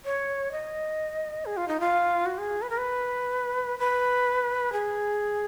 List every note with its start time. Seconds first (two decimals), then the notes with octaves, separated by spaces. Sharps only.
0.05 C#5
0.52 D#5
1.46 G#4
1.57 F4
1.68 D#4
1.80 F4
2.26 F#4
2.38 G#4
2.62 B4
2.70 A#4
2.78 B4
3.79 B4
4.73 G#4